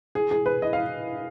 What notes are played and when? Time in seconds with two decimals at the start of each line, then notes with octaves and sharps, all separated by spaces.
0.15 G#4
0.31 G#4
0.46 B4
0.62 D#5
0.73 F5